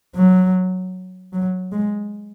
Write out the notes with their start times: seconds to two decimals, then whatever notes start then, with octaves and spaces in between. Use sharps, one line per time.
0.16 F#3
1.33 F#3
1.72 G#3